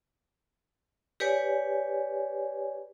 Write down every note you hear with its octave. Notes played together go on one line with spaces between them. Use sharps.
G4 B4 C#5 D5 G#5